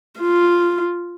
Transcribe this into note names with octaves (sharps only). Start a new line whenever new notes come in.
F4